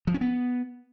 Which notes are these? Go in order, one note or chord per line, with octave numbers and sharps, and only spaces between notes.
F3
C#4
B3